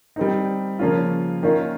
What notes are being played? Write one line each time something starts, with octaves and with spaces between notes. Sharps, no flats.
G3 C4 D#4
C#3 F3 A#3 C#4 F4
D#3 A#3 C#4 F4